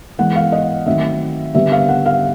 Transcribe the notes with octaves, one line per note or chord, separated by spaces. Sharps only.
E3 G#3 B3 F#5
F5
D#5
D#3 F#3 A3 C4 E5
D3 G3 B3 E5
F5
F#5
F5